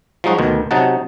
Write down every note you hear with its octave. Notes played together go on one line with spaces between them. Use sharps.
F3 F#3 G#3 D#4 F#4
D2 B2 D#3
C3 F#3 D#4 F#5 A5